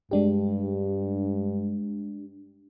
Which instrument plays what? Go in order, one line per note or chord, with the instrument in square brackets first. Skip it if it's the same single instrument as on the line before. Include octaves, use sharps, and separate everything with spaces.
[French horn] G2 [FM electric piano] G#3 D4 G4